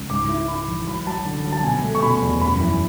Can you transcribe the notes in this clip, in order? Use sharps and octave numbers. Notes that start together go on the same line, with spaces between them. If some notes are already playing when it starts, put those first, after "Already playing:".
Already playing: C#2
G#2 D6
E4
E4 B5
E3
F#3 B5
F#3 A5
D3
F#3
A5
B2 G#5
A3
C#6
B2 B5
E2
F#2 B5
E3